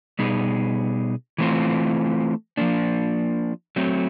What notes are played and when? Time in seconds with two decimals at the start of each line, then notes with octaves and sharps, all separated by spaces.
0.19 B2 G3 B3 D#4 G#4
1.38 E3 A3 C4 F4
2.57 F3 A#3 D4
3.76 F#3 A3 C4